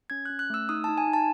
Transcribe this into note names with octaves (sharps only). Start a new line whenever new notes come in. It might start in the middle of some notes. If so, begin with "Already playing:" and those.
C#4 G#6
C#4 F#6
F#6
A3 E6
D#4 D#6
D#4 A5
G#5
D#4
A5